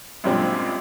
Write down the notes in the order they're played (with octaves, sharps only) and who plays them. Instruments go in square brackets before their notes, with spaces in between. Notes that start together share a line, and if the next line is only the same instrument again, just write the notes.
[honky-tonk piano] F#2 A#2 G3 G#3 C4 D4